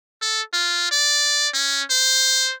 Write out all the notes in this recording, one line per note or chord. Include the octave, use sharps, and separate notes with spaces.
A4
F4
D5
C#4
C5